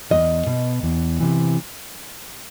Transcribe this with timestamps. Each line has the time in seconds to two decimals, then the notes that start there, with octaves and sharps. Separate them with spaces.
0.10 E2 D#5
0.47 B2
0.83 E2
1.20 C3 E3